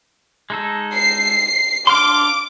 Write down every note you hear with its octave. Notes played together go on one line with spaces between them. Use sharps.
G#3 D#4 A4
C7
D4 F5 C6 D6